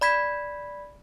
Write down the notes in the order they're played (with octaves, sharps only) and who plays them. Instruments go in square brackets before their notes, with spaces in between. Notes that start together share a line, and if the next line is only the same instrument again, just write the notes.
[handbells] D5 B5 G#6 B6